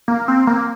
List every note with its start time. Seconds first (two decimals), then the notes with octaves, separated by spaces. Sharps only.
0.08 A#3
0.28 C4
0.47 A#3